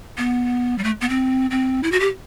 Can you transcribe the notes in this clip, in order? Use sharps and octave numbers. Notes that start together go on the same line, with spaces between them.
B3
G3
A3
B3
C4
C4
E4
F#4
G4